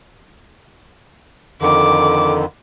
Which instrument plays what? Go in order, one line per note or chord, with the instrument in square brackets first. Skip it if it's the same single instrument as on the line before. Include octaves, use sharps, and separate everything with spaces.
[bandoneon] F2 D3 D#3 [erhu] D6